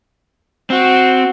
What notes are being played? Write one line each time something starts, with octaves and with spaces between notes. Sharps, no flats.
C4 F#4